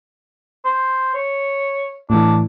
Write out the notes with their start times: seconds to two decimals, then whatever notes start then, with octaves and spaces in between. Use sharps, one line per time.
0.65 C5
1.14 C#5
2.10 A2 E3 D4